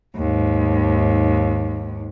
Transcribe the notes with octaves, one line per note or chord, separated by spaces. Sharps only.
D#2 G#2